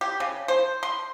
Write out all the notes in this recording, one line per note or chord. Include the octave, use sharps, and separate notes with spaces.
G4
C#3
C5
C6